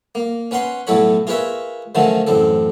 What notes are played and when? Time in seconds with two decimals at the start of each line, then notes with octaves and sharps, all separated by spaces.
0.15 A#3
0.51 C#4 B4 F#5 A#5 C6
0.87 B1 A2 F#3 A4 C#5 B5
1.27 F4 G#4 A#4 B4 C#5 E5
1.95 D3 D#3 F3 F#3 A3 C#4
2.27 A1 F#2 C4 A4